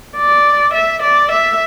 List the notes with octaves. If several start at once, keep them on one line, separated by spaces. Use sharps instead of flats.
D5
E5
D5
E5